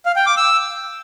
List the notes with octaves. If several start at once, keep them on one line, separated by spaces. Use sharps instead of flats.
F5
G5
D6
E6